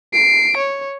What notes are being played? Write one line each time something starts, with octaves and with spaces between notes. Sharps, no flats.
C7 D7
C#5